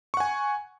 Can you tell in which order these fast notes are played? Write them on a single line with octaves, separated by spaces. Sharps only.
C#6 F#5 G#5